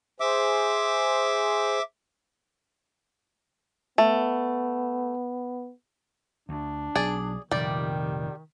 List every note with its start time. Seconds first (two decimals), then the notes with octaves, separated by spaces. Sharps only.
0.20 G#4 C5 E5 D6
3.98 A3 B3
6.49 D2 D4
6.96 B1 G#4 D5
7.51 F1 A#2 D#3 G3 D5